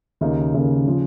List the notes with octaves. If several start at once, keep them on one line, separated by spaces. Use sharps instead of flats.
D#2 C#3 A#3 D#4
D#2 C#3 A#3 D#4
C#3 F3